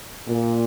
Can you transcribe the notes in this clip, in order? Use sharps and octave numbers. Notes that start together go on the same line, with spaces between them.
A#2